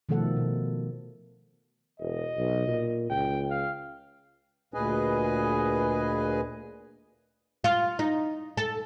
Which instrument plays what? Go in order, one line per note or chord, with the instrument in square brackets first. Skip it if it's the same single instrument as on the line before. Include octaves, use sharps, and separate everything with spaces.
[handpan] B2 D#3 F3 A3 A4 F#5
B2
[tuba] E1 [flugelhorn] D#5
[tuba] B1
A#2
[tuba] C#2 [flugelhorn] G5
[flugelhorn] F5
[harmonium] D2 A#2 G#4 B4 D#5 G#5
[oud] F4
D#4
A4